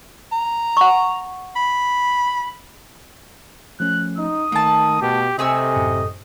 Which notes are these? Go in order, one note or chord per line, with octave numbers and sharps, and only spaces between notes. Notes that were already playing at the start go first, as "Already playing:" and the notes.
A#5
F#5 C#6
B5
F3 A3 C#4 F#6
D#4 D#6
D#3 A3 A#3 A5
B2 G4
C3 A3 G4 D#5 G#5 E6
G#1 F#2 A2